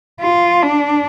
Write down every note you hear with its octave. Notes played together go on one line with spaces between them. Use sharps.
F4
D4